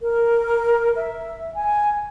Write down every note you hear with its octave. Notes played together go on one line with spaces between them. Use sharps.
A#4
E5
G#5